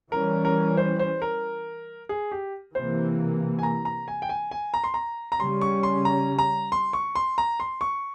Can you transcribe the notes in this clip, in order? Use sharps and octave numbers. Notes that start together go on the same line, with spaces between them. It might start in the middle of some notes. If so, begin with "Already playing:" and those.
E3 G3 C#4 A#4
A#4
C5
C5
A#4
G#4
G4
C3 E3 A#3 C5
G#5
A#5
A#5
G#5
G5
G#5
G#5
A#5
C6
A#5
A#5
C#3 G3 C#4 C6
C#6
C6
A#5
A#5
C6
C#6
C6
A#5
C6
C#6